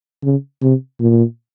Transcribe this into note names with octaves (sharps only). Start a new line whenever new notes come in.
C#3
C3
A#2